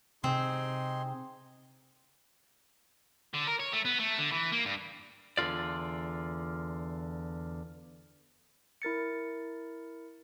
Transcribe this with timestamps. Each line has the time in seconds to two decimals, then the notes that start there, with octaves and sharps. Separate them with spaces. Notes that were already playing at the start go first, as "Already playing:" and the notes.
0.24 C3 C4 D#4 G#4 C6
3.34 D3
3.47 A#4
3.59 C#5
3.73 A3
3.85 B3
3.99 A3
4.19 D3
4.32 E3
4.52 A#3
4.66 G2
5.37 E2 D3 F4 D5
8.82 E4 A#4 A6 C#7